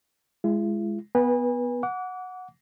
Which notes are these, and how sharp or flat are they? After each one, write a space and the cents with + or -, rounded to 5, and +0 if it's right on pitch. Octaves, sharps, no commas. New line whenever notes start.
G#3 +0 E4 +45
B3 +0 B4 -25 G#5 -30
F#5 -10 D6 -35